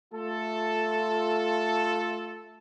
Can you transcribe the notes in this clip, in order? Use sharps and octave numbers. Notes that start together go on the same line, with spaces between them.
A3 F4 A4